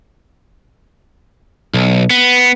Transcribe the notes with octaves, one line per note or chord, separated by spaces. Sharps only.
B1
B3